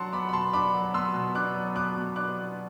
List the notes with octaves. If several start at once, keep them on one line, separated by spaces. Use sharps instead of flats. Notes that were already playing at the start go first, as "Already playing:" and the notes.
Already playing: F#3 D4 F#5 A5 C6
B3 B5 D6
B5
B2 A5 C6
D4 B5 D6
F#3
B3 C6 E6
B2
D4 D6 F#6
F#3
B3 D6 F#6
B2
D4 D6 F#6
F#3